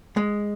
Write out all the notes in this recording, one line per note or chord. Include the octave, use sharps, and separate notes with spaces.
G#3